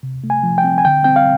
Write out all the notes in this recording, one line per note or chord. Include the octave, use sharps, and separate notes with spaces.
C3
A3
G#5
F3
G5
C4
G#5
D3 G5
C4 G5
F5